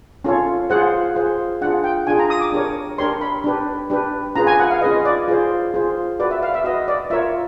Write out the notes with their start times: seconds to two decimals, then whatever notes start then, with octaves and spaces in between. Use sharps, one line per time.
0.25 C#4 F4 A4 C#5
0.70 F4 G#4 C5 F#5
1.15 F4 G#4 C5
1.61 D4 F4 G#4 F#5
1.84 G5
2.07 D4 F4 G#4 G#5
2.19 A#5
2.30 D#6
2.41 D6
2.52 D4 G4 A#4 C#5
2.98 D4 G4 A#4 C#5 C6
3.21 B5
3.44 D4 G4 B4
3.90 D4 G4 B4
4.36 C#4 F4 G#4 B4 A#5
4.47 G#5
4.59 F#5
4.70 F5
4.81 C#4 F4 G#4 B4 D#5
5.05 D5
5.28 F4 G#4 C5
5.74 F4 G#4 C5
6.19 F#4 B4 D5
6.31 E5
6.43 F5
6.54 E5
6.64 F#4 B4 D#5
6.88 D5
7.10 F4 A#4 C#5 E5